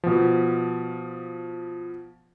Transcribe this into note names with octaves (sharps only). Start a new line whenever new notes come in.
B2 F3